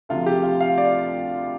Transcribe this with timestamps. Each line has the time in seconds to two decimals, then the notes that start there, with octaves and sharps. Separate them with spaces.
0.09 D2 C3 F3 F4
0.26 G4
0.43 F4
0.60 F5
0.78 D5